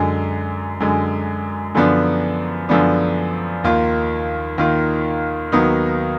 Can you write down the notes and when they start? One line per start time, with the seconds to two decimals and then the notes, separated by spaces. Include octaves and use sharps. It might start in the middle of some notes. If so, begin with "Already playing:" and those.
Already playing: F#2 D3 G#3
0.80 F#2 D3 G#3
1.74 F#2 D3 F3 B3 D4
2.69 F#2 D3 F3 B3 D4
3.64 D#2 D#3 A#3 F4
4.58 D#2 D#3 A#3 F4
5.52 D#2 D#3 F#3 B3 D#4